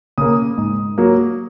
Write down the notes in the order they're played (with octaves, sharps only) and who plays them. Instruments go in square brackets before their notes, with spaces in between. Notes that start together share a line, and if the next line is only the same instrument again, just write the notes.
[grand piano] C#3 A#3 D#6
G#2
F#3 A#3